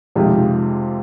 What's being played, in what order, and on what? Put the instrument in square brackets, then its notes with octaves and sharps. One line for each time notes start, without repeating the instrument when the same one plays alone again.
[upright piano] F2 C3 D#3 G#3 F4 G4